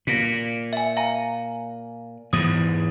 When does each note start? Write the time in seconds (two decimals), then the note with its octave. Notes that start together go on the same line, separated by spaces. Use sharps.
0.07 A#2 A#6 B6
0.73 E5 G#5
0.97 F5 G#5 A#5
2.33 E2 G#2 E3 D#6